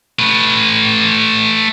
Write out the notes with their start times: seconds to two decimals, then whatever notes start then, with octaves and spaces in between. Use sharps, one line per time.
0.19 A3 B4